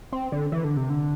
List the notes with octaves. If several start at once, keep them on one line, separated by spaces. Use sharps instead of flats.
C4
D3
E3
D3
C3
D3